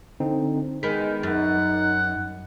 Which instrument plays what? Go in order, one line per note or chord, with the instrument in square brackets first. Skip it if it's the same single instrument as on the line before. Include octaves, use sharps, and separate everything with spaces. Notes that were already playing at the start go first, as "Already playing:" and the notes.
[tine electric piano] D3 C4 D#4
[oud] D#3 B3 [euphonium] G#3 [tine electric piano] B6
[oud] F#2 [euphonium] D#4 [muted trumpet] F#5 [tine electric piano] A6